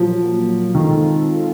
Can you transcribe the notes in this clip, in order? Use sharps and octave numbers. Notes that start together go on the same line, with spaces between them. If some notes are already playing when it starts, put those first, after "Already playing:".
Already playing: A#2 F3 F#3 A#3
D#3 G#3 C4 F4 A4